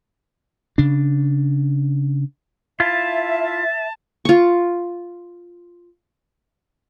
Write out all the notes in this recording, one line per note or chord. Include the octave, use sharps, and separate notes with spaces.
C#3 D4
E4 F4 E5 A5
F4 C#6